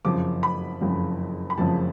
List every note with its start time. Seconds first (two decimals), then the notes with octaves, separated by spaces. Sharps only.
0.05 F#1 F2 C#3 F3 D6
0.43 B5
0.81 F#1 F2 C#3 F3
1.50 B5
1.58 F#1 F2 C#3 F3 A5